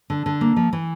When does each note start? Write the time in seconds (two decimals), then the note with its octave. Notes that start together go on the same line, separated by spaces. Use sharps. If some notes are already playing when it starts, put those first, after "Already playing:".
0.10 D3
0.26 D3
0.41 A#3
0.56 F3
0.73 E3